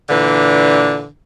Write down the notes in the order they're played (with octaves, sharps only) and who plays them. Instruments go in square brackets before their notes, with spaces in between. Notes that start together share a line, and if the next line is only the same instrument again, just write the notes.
[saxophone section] A#2 D3 E3 D4